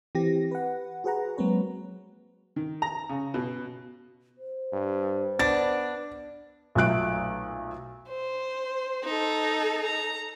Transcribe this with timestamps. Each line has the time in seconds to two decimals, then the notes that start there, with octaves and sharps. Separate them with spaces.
0.15 E3 C4 G4 A#6
0.51 B4 F#5
1.04 F#4 G#4 B4 F#5 A#5
1.37 F#3 G#3 A#3 C4 B4 C#5
2.56 D#3
2.82 A#5
3.09 C#3
3.34 B2
4.38 C5
4.73 G2
5.39 B3 D4 A6
6.75 B1 A#2 F#3 A3 F#6 D7
8.09 C5
9.04 D#4 A4
9.83 A#5